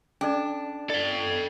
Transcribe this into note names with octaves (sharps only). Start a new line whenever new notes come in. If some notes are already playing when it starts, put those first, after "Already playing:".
C#4 D4 A4 D5
A4 D5 G5